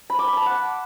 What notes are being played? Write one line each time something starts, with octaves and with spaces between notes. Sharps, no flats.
B5
D6
B5
A5
F#5